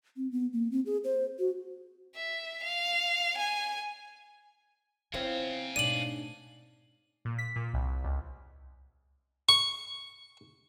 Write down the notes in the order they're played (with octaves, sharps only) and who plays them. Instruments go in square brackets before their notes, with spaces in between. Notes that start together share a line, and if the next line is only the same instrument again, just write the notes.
[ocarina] C4
B3
A#3
C4
G#4
C5
F#4
[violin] E5
F5
G#5
[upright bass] B3 [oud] C4 E4 F4 [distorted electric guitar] F5 G#5
[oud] G#2 D4 [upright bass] B2 A3 [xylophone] D#7 F#7
[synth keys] A#2
B6
A#2
C2
C#2
[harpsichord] C#6